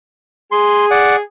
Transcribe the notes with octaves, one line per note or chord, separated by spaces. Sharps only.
G#4 C6
D5 F#5